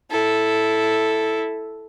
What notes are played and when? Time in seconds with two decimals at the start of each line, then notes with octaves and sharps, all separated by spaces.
0.11 E4 A4